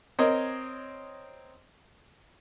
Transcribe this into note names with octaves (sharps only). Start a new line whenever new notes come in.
C4 A#4 C#5 D#5